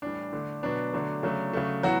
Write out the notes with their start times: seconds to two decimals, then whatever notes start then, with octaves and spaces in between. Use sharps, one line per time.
0.02 A2 E3 G3 D4
0.33 D3 A3
0.63 B2 F#3 B3 D4
0.93 D3 F#3 A3
1.23 C#3 F#3 A3
1.53 C#3 F#3 A3
1.83 A2 E3 F#3 B3 F#4